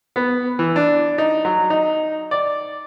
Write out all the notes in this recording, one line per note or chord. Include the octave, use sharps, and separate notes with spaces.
B3
E3
D4
D#4
F#3
D#4
D5